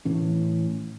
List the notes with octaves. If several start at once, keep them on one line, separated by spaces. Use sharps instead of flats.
A2 E3 C#4